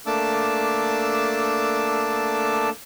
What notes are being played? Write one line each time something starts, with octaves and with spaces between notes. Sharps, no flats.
A3 A#3 D4 A5 D6 E6